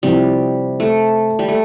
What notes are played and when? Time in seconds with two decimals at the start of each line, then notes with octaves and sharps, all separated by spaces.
0.03 C3 F3 G3 C4 E4
0.80 A3
1.39 G3
1.48 A3